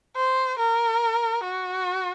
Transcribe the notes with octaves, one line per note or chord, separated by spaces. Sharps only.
C5
A#4
F#4